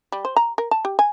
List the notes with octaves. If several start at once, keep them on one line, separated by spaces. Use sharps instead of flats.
G3
C5
A#5
A#4
A5
G4
G#5